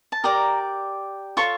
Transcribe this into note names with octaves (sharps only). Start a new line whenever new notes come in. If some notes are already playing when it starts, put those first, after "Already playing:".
A5
G4 A#4 D5 A#5
F4 A4 C#5 C#6